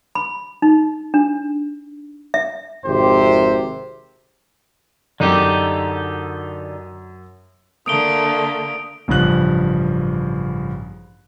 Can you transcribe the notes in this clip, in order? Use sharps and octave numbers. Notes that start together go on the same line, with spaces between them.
B5
D#4
D4
E5
G#1 F2 C3 G4 C5
F#2 D3 D#4 G4
D3 A3 A#3 D#6 D7 G7
A1 G2 C#3 F3 F#6 F#7